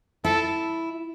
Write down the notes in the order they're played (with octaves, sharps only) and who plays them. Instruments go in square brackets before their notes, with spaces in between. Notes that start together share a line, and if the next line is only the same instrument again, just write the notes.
[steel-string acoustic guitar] E4 [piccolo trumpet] A4